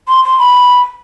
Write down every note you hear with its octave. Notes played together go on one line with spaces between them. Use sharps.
C6
C6
B5